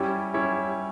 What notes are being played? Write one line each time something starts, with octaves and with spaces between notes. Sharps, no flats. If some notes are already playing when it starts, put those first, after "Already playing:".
Already playing: G3 C#4 E4 G4 C#5
G3 C#4 E4 G4 C#5